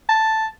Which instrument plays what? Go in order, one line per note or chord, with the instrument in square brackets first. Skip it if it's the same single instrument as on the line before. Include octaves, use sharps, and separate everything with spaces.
[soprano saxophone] A5